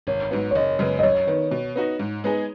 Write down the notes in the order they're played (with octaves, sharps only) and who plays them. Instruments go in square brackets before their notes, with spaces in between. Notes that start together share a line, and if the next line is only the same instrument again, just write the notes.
[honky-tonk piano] G#1 [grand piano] C#5
[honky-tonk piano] G#2 F#3 B3
[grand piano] C#5
[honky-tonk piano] F#1 [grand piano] D#5
[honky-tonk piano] F#2 C#3 G#3 B3
[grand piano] D#5
[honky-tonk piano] F#2 [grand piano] C#5
[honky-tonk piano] D#3 B3
B2
B3 D#4 F#4
G#2
G#3 B3 D#4 G#4